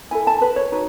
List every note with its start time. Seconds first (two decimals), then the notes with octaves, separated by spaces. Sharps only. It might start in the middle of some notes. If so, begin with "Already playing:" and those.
0.11 E4 A4 G#5
0.27 A5
0.41 B4
0.56 C#5
0.72 D#4 F#4 B4